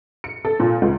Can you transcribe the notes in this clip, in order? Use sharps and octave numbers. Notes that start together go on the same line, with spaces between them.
C#7
A4
A#2
C#2